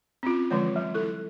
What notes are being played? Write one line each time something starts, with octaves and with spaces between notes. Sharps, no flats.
C4 C#4 F4
D3 E3 F3 G#3 C#5
F#3
E4 A4